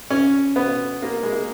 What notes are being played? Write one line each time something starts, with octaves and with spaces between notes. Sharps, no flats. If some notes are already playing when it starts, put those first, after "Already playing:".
C#4
B3
A#3
G#3
A#3